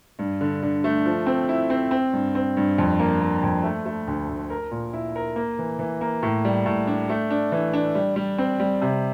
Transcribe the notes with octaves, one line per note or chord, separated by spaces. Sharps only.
G2
D3
D3
A3
F3
C4
E4
C4
C4
G2
C4
G2
F2
A#3
A#3
F2
A3
A3
D2
D2
A#4
A#2
E4
A#4
A#3
E3
E3
A#3
A2
G3
A2
D4
A3
D4
E3
D4
G3
G3
C4
G3
C3